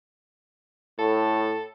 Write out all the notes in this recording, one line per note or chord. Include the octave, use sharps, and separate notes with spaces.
A2 A4